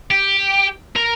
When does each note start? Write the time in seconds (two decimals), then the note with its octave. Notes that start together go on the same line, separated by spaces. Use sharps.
0.11 G4
0.96 A#4 A#5